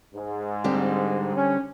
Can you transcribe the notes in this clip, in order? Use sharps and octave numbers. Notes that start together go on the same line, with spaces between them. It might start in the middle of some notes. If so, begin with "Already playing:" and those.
G#2
D3 G3 C4
C#4